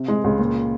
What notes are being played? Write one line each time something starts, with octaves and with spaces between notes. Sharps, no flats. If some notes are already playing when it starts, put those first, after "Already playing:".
Already playing: C3
G#3
C#2
A#2